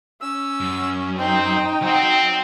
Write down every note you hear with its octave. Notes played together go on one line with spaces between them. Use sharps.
C#4 E6
F#2
C4 D#4 G5
F#3 C4 F#4